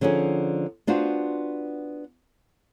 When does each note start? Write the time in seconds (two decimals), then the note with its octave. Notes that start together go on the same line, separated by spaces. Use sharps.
0.01 D3 F3 C#4 D#4 G#4
0.87 B3 D4 F4 F#4 C5